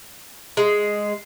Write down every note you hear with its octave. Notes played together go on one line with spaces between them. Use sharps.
G#3